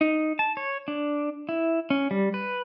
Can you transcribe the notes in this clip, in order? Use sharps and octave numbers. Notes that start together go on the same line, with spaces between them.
D#4
A5
C#5
D4
E4
C#4
G3
B4